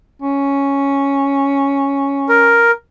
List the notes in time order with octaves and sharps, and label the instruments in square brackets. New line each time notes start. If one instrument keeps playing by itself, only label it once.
[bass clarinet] C#4
[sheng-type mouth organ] A#4